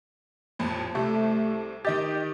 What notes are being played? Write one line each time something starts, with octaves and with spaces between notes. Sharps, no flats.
A1 F2 A#2
C2 C3 A3
D#3 G4 D#5 A6